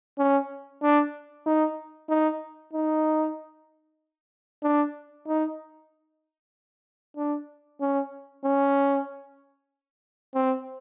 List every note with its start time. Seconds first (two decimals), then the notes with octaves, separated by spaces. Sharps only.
0.19 C#4
0.82 D4
1.46 D#4
2.09 D#4
2.73 D#4
4.63 D4
5.27 D#4
7.17 D4
7.81 C#4
8.44 C#4
10.34 C4